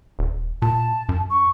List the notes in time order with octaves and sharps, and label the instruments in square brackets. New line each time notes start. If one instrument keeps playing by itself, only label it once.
[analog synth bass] D#1
[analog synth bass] A#2 [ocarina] A5
[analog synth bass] F#2
[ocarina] C#6